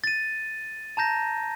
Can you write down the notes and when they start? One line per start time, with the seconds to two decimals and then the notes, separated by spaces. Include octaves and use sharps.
0.04 A6 D#7
0.97 A5 A#5 G6 A#6